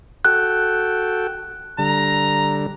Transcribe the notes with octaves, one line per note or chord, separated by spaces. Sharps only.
F#4 A4 G5 F#6
D3 G3 A#5